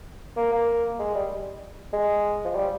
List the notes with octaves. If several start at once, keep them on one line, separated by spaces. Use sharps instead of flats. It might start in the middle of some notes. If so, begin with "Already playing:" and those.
A#3
A#3
G#3
G3
G#3
F3
G3